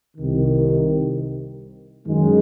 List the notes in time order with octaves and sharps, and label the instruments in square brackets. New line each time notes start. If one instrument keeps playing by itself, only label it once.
[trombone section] C2 C3 D#3
F#2 D#3 G#3